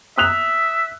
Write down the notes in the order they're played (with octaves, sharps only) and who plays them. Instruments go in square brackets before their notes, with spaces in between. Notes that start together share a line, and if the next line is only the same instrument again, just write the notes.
[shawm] E5 [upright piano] D#6 F#6 F7